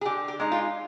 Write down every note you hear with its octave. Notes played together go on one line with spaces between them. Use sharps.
G#4
D3 G4
G4
G#3 D#4
F4